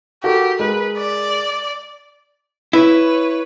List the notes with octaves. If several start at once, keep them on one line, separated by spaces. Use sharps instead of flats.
F#4 G4 A4 A#4
G#3 A#4 B4
D5
E4 B4 C#5